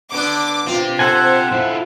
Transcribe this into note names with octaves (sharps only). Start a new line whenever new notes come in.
D3 B3 D4 D6
C4 F4 G4
A4 C5 F#5 G#5
E4 F4